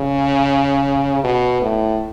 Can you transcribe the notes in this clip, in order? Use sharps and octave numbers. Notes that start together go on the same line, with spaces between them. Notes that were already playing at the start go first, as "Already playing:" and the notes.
Already playing: C#3
B2
A2